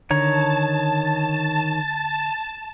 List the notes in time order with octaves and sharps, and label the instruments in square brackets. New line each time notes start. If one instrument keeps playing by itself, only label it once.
[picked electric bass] D3 [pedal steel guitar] D#3 C#5 A#5 [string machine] A5